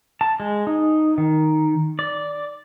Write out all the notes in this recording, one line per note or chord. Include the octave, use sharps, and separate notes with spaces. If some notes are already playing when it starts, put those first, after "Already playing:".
A5
G#3
D#4
D#3
D5